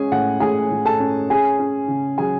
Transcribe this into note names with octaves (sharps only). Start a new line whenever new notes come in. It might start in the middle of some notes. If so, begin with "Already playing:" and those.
Already playing: G#3 C#4 G#4 G#5
A2 F#5
A2 G#4 G#5
A2
A4 A5
C#4
C#4 G#4 G#5
C#4
C#3
F#3 G#4 G#5